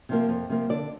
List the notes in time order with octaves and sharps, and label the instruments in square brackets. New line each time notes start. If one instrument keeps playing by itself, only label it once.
[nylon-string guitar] C3 F3 A#3
F2
C3 F3 A#3
D3 D5